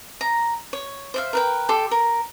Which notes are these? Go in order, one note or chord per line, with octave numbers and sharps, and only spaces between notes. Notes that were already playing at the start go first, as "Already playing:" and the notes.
A#5
C#5
C5 E5 F5
A#4 B4 G5
G4 A4 C6
A#4